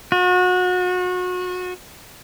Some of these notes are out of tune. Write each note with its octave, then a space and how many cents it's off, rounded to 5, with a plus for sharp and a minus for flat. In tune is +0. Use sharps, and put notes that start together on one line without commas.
F#4 -30